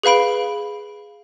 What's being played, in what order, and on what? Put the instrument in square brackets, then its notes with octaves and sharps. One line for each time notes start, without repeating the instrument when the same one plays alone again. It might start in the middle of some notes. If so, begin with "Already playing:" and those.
[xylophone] G#4 B4 F5 B5 D7